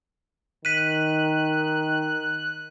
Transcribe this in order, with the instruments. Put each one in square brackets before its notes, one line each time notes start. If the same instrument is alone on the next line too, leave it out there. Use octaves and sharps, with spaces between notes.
[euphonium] D#3 [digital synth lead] F#6 [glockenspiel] B6 D#7